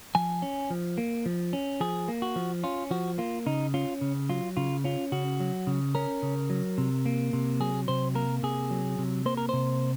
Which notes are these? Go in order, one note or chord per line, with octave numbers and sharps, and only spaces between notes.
F3 G#5
C#4
F3
A#3
F3
C#4
F3 G#4
A#3
F#4
F3
C#4 F4
F3 F#4
A#3 F4
C#3 D#4
C#4 F4
C#3
F#3 F4
C#3 F4
C#4 F4
C#3 F#4
F#3
C#3
C#4 A#4
C#3
F#3
C3
A#3
C3
F#3 G#4
C3 C5
A#3 A#4
C3 G#4
F#3
C3
A#3 C5
A#4
C3 C5